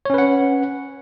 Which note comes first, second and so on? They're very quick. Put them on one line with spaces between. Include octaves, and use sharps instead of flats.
C#5 C#4 B4 F#5